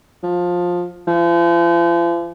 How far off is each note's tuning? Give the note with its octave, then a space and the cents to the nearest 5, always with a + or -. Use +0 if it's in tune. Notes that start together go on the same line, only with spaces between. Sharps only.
F3 +15
F3 -40